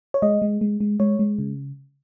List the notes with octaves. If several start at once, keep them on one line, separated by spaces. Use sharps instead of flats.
C#5
G#3 D#5
G#3
G#3
G#3
G#3 C#5
G#3
C#3